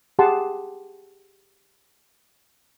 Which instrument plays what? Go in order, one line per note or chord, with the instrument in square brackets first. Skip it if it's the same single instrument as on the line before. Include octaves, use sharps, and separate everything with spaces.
[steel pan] G4 G#4 F#5 A5 C6